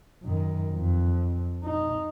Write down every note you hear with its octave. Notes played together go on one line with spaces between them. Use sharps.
F#2 D#3
F2
D#4